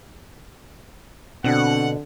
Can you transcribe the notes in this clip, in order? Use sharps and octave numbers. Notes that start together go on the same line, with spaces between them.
B2 D3 C4 D4 F#4 F#5